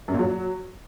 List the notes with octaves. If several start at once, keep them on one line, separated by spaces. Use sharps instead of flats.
F#2
A#2
F#3